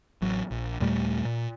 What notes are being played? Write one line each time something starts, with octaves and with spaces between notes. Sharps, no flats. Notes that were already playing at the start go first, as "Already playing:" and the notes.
A1 F#3
A#1
D#2 A#2 G3 A3
A#2